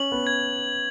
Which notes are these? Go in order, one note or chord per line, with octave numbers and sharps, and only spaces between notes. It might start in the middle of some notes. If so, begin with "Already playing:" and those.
Already playing: C#4 F#7
B3
G#6